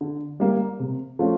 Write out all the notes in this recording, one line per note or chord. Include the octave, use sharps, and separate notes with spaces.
D3
G3 A#3
C3
F3 A3 C#4 F4